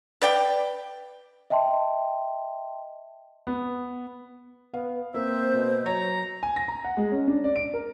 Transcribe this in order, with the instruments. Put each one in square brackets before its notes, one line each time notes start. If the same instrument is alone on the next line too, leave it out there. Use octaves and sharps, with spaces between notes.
[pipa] B4 D5 G5
[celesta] D#5 E5 G5 A5 C6
[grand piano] B3
[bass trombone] B3 [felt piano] F5
[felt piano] A#3 [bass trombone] C4 [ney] C5 [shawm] E5
[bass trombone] B2
[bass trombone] F#3 [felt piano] C#5 [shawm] A#5
[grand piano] G#5
A#6
A#5
F#5
G#3
C#4
D4
D5
D7
A#4